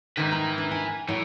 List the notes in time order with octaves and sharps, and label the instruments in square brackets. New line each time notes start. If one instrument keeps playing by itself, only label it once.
[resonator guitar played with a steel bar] G#2 D#3 [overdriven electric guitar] E4 B4
[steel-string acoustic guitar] A#5
D4
G#5
[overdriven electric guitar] A2 [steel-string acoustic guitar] F#3 E4